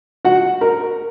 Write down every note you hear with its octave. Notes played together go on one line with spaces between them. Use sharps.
F#4 F#5
A#4 A#5